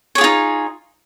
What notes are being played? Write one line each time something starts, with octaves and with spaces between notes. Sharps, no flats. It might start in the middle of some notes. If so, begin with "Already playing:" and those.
D#4 F4 G#4 C#5